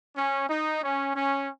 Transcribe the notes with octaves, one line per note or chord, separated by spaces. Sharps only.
C#4
D#4
C#4
C#4